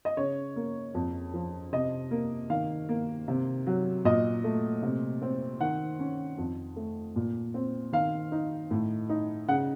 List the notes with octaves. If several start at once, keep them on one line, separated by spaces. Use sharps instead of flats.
D#5
C#3 C#5
A#3
F2
F3
C3 D#5
A#3
D#3 F5
A#3
C3
F#3
A#2 D#5
A3
C3
C4
D#3 F#5
C#4
F2
A3
A#2
C4
D#3 F5
D#4
A2
D#4
C#3 F#5